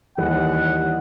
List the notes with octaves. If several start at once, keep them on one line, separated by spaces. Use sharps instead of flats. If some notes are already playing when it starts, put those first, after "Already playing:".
D#2 E3 G3 F#5